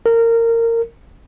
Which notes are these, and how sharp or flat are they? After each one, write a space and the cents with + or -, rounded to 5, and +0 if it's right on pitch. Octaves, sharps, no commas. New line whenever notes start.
A#4 -20